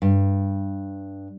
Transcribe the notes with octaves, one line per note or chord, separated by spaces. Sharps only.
G2